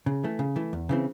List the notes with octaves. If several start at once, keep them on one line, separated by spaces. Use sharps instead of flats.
C#3
E3 A3
C#3
E3 A3
E2
C#3 E3 C4